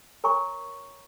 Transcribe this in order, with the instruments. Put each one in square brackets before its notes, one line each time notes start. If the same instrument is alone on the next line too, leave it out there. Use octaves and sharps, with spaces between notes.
[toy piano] A#4 C#5 G#5 A#5 C#6